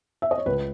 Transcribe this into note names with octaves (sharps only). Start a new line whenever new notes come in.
E5
D#5
C#5
C#2 B4